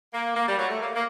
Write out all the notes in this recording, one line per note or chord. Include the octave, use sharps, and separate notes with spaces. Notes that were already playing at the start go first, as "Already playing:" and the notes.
A#3
A#3
G3
F#3
A3
A#3
A#3